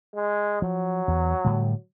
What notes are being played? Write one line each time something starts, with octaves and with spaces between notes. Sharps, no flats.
G#3
F3 F#3
E2
A2 D3 G3